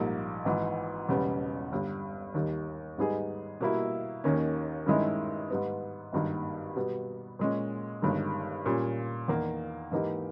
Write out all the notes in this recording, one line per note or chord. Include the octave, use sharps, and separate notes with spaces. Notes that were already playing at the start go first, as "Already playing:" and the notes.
Already playing: A#1 G#2 G3 A#3 D#4
G#1 G#2 E3
E1 E2 C#3 G3 B3
G1 G2 G3
D#2 D#3 G3
G#2 G3 B3 D#4 G#4
B2 G3 A#3 E4
D#2 D#3 A#3 C#4
G2 D#3 G#3 C#4 E4
G#2 G3 B3
G#1 G2 D#3 A#3
B2 G3 B3
A#2 G#3 C#4
G1 G2 D#3 G#3
A#2 G3 C#4
E2 D#3 A#3
G#2 E3 A#3 D#4 G4